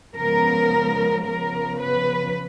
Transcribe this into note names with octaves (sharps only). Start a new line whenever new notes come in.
C#3 F3 G#3 B3 A#4
C#3 F3 B3 A#4
B4